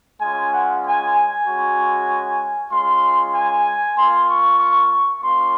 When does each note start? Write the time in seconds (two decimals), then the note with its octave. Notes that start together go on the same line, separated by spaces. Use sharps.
0.21 G#3 C#4 F4 G#5
0.52 F#5
0.84 G#5
1.15 G#5
1.46 G#3 C#4 F#4
2.71 G#3 C#4 F4 C6
3.34 G#5
3.96 A#3 F4 C6
4.28 C#6
4.59 C#6
4.91 C#6
5.22 A#3 C#4 F4 C6